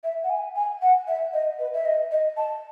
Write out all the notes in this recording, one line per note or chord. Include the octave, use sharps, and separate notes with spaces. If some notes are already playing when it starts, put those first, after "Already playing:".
E5
F#5
G#5
G#5
F#5
E5
D#5
B4
E5
D#5
D#5
A5